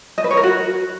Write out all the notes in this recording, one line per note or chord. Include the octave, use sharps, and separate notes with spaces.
D#5
B4
C#5
A#4
F#4